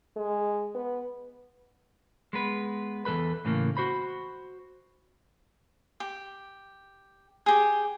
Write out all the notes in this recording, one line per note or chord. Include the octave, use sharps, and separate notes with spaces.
G#3
B3
G#3 B3 B4
E2 D#3 A4 B4 B5
A2 C#3 E3 A3 A#3
F#4 C5 B5
G4
G4 G#4